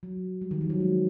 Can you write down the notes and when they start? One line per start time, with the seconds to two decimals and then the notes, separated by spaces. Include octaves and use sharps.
0.03 F#3
0.42 G3
0.51 D#3
0.61 F3
0.70 F#3
0.80 G#3